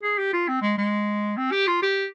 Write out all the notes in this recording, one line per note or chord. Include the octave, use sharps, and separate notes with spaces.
G#4
G4
F4
C4
G#3
G#3
C4
G4
F4
G4